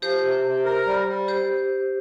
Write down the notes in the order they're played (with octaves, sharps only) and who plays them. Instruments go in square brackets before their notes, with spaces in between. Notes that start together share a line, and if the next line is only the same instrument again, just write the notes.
[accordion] F3 [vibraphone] G4 C5
[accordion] C3
C3
A#4
G3
G3
[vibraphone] G4 C5